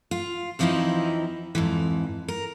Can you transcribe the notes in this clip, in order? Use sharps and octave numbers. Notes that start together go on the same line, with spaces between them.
F4
F2 E3 F3 C4 D#4 E4
F2 G#2 E3
A#4